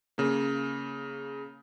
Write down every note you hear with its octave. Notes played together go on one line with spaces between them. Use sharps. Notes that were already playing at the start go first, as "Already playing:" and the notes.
C#3 A#3